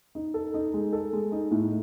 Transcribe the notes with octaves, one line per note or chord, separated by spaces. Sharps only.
D#4
A4
D#4
G#3
A4
G#3
D#4
A2